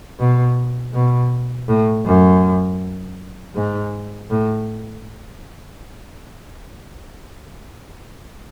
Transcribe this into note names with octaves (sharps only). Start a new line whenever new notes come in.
B2
B2
A2
F#2
G#2
A2